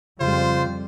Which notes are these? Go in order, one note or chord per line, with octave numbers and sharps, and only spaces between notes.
F2 C#3 G3 F4 C5